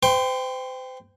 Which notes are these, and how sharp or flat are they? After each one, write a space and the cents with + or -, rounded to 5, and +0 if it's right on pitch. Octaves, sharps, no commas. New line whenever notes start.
C5 -35 G5 +10 C6 +35